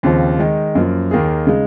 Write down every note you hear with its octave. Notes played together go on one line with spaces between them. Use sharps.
D#2 C#3 F3 C4
D#3 G#3 D#4
F#2 F3 A#3
D#2 D#3 A#3 D#4 G#4
C#3 G#3 D#4